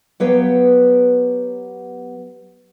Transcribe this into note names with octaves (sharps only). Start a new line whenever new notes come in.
F#3 B3 G4 B4 C#5 F5